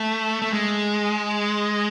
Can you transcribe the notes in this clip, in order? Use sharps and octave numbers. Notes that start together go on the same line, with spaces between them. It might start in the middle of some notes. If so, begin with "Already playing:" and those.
Already playing: A3
A3
G#3